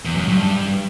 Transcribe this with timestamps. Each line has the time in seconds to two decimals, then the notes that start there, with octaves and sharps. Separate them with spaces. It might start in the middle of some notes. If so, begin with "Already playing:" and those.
0.05 E2
0.17 F#2
0.28 G2